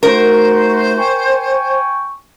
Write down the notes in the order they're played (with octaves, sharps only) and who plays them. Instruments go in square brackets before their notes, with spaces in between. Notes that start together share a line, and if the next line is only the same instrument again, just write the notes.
[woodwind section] A3 D#4 F#4 [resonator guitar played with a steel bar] A#4 [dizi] C5
[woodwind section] G5 G#5 C#6